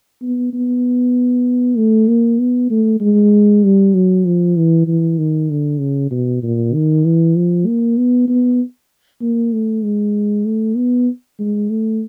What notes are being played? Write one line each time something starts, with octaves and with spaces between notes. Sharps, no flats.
B3
B3
A3
A#3
B3
A3
G#3
G3
F#3
F3
E3
E3
D#3
D3
C#3
B2
A#2
D#3
E3
F3
A#3
B3
B3
A#3
A3
G#3
A3
B3
G#3
A3